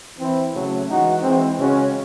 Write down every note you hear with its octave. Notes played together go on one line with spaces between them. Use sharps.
E3 C4 E4
C#3 F#3 A3
E3 G#3 D#4 F#4
E3 G#3 C4
C#3 G#3 C#4 F#4